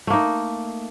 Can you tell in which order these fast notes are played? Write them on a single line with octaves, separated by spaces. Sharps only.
A3 A#3 D#4